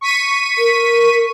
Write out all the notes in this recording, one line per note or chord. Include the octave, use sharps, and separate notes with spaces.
C#6 B6 D#7
A#4